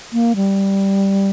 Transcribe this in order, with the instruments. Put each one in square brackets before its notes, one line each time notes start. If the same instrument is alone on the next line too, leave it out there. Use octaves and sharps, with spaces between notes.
[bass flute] A#3
G3